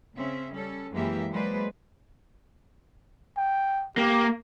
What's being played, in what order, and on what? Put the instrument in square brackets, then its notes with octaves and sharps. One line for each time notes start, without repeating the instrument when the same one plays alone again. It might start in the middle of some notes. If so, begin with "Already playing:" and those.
[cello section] C#3 C4 C#4 E5
G3 C#4 A4
F#2 E3 G#3 A#3 G4 E5
F#3 G#3 A#3 B4 C5 D5
[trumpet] G5
[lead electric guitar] A#3 [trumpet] G4